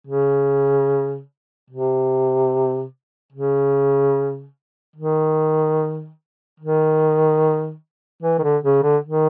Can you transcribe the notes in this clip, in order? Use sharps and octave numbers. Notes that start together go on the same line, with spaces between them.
C#3
C3
C#3
D#3
D#3
E3
D#3
D3
C#3
D3
D#3